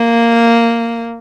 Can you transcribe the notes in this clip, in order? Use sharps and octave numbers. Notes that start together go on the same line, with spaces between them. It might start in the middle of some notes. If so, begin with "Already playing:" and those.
Already playing: A#3